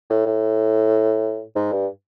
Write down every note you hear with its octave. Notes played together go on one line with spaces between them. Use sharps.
A2
A2
G#2
G2